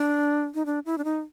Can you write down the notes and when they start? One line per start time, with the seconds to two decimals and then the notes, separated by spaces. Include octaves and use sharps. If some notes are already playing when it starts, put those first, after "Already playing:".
Already playing: D4
0.54 D#4
0.66 D4
0.86 E4
0.98 D4
1.04 D#4